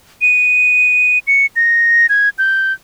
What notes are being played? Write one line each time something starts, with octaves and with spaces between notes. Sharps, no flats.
D#7
C#7
A#6
G#6
G6